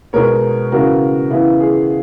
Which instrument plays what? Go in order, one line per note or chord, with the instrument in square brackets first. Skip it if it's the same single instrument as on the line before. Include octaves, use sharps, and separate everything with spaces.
[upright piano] B2 G#3 B3 D#4 A#4 C#5
C#3 E3 B3 F#4 A#4
C#3 E3 B3 E4
G#4